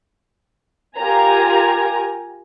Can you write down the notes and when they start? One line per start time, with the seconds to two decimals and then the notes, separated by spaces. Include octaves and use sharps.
0.98 F4 G4 A#4 G#5 A#5